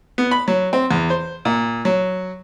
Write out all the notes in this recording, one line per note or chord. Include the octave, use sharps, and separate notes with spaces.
B3
B5
F#3
C4
E2
C5
A#2
F#3